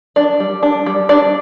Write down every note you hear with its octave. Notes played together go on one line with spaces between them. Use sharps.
D4 D5
G3
D4
G3
D4 D5